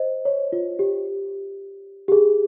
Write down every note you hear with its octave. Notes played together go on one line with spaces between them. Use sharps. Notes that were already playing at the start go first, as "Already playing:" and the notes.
Already playing: C5 D#5
C#5
F4
G4
G4
G#4